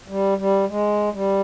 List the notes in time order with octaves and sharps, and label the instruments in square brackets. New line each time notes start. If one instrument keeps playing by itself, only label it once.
[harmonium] G3
G3
G#3
G3